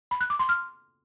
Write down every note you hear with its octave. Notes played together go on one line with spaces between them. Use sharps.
B5
F#6
D6
C6
F6